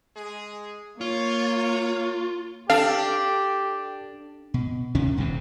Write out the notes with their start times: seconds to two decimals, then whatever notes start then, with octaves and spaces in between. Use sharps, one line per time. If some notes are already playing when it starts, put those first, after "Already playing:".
0.16 G#3 G#4
1.01 A#3 F4 C#5
2.70 D4 G4 A4 F5
4.54 B2
4.95 D#2 C3 C#4
5.17 D#1 C2 G2 C3